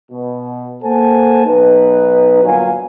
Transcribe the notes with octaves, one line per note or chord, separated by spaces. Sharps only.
B2
A#3 A4 C5 F#5 G#5 A5
B1 D#4 B4
G1 A#2 F#3 B4 F5 G#5